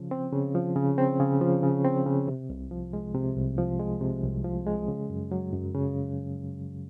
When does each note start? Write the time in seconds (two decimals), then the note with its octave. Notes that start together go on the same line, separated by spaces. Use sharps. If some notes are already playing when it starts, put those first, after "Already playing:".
Already playing: C#3 F3
0.11 C4
0.33 C#3
0.55 F3
0.76 C#3
0.98 C4
1.20 C#3
1.41 F3
1.63 C#3
1.85 C4
2.06 C#3
2.28 C3
2.50 C2
2.71 F3
2.93 G#3
3.15 C3
3.36 C2
3.58 F3
3.80 G#3
4.01 C3
4.23 C2
4.45 F3
4.66 G#3
4.88 C#3
5.10 F#2
5.32 F#3
5.53 F#2
5.75 C#3